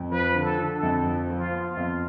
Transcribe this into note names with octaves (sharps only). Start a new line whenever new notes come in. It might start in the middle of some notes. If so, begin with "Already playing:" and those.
Already playing: F2
F3 B4
D3
A4
D3
A4
F2
F3
F3
F4
B3
F4
F2